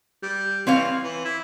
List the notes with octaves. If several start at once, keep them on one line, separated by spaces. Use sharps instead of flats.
G3
E3 C4 C#5 F5
E3
E4